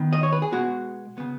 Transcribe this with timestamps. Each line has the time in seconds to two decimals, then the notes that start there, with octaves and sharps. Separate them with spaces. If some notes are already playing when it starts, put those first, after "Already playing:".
Already playing: D#3 B3
0.13 D#5
0.23 C#5
0.32 B4
0.42 G#4
0.52 B2 G#3 B3 F#4
1.18 C#3 B3